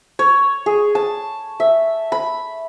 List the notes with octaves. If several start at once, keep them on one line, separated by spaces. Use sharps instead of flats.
C#5
G#4
A5
E5
B5